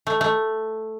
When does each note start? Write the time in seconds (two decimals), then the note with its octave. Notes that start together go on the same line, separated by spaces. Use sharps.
0.07 A3
0.21 A3